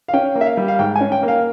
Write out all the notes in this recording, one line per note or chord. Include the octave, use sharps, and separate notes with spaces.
F5
C#4 G5
A#3
E5
F5
G3
F5
G#2 G5
G#5
C#4
G5
A#3
F5